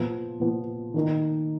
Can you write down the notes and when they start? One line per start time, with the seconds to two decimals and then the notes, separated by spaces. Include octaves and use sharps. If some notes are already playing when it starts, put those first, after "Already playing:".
Already playing: A#2 F3 B3
0.40 A#2 F3 B3
0.94 D#3 A#3 D#4